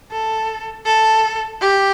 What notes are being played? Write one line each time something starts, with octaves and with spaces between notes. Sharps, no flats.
A4
A4
G4